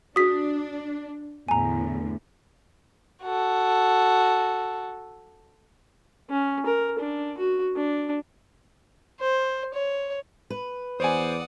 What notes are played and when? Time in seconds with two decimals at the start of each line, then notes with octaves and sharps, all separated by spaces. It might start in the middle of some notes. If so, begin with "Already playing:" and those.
0.16 D4 F#4 G#4 D#6 B6
1.48 E2 A2 D3 G#5 A#5
3.23 F#4 A4
6.30 C#4
6.66 A#4
6.99 D4
7.38 F#4
7.76 D4
9.20 C5
9.74 C#5
10.50 B4
11.00 E2 C5 D5 F#5 G#5 D#6